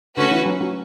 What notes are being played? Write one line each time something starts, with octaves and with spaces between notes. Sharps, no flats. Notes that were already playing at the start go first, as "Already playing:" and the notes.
D3 A3 C#4 F#4 B4
E3
F#3
F#3